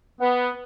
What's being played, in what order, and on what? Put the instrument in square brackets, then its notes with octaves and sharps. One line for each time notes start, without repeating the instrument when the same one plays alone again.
[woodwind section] B3